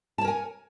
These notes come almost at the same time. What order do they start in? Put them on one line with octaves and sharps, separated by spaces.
A5 C#5 A#4 G#5